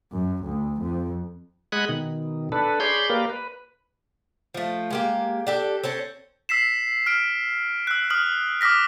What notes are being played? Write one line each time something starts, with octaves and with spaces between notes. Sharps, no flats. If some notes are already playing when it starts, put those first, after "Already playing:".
F#2
D2
F2
G#3 D#5 F#5 G#5 B5 F#6
B2 D#3
D4 A4 B4
G#4 C#5 D5 B5 C6 G6
A#3 G4 A#4 B4 D5 F5
B4
F3 A3
G#3 A#3 G4
D4 G4 A4
C4 C#4 A4
E6 B6 C7 E7
F6 D7
E6 F#6
D#6 F6 F#7
D6 D#6 F6 A#6 B6